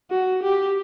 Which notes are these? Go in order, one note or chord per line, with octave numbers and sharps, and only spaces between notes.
F#4
G4